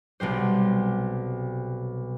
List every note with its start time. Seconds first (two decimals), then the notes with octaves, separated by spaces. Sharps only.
0.20 B1 C3 G3 C5